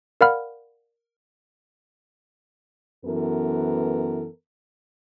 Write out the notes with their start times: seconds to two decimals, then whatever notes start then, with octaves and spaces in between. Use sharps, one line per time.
0.21 A#4 D5 F5 F#5 B5 F6
3.05 F#2 E3 B3 A4 A#4